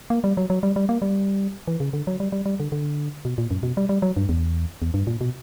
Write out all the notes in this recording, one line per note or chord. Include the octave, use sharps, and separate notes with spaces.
A#3
G3
F#3
F#3
G3
G3
A#3
G3
E3
C#3
D3
F#3
G3
G3
G3
D3
D3
B2
A#2
F#2
B2
G3
G3
F#3
G2
E2
E2
G2
A#2
B2